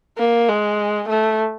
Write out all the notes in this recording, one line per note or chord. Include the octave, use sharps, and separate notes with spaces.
A#3
G#3
A3